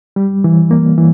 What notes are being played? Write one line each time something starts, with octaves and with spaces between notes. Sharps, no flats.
G3
E3
A#3
E3